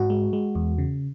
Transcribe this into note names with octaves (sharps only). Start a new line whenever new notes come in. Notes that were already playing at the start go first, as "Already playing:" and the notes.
Already playing: G#2 F#4
G#3
G#3
E2
C#3